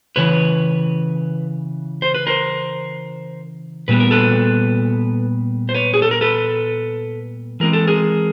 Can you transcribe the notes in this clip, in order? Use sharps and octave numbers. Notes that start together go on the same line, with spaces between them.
C#3 E3 B4 C#5
C5
B4
A#4 C5
A#2 G3 B3 B4
A#4
A4 B4
C5
B4 C#5
G#4
A4
A#4
A4 B4
E3 G#3 C4 A#4
A4
G#4 A#4